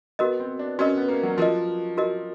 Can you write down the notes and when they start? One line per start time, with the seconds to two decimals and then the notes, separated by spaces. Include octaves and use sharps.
0.19 B3 F#4 A#4 D#5
0.40 C4
0.59 D4
0.79 C#4 F#4 A#4 D#5
0.97 B3
1.08 A#3
1.23 F#3
1.37 F3 F#4 A#4 D#5
1.97 F#4 A#4 D#5